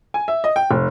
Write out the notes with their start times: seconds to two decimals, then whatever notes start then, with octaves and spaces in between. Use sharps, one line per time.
0.14 G#5
0.28 E5
0.44 D#5
0.56 G5
0.71 F1